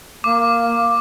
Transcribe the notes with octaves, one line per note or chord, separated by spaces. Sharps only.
A#3 D6